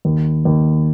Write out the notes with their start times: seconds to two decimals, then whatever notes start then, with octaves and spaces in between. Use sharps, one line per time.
0.05 D#2
0.45 D#2